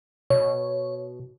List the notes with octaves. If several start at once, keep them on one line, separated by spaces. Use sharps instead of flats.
B2 C#5